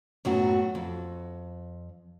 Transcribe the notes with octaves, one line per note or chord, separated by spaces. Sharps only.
F#2 A2 F#3 B3 F#4
F2